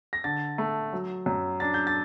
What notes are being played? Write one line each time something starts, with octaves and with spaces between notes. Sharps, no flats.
A#6
D3 A6
A3
F#3
F#2
D4 A6
G6
A6